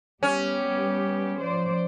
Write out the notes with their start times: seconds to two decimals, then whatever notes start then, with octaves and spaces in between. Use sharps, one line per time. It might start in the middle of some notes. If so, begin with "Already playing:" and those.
0.23 G3 B3 C#4 G4
1.41 F3 C5 D5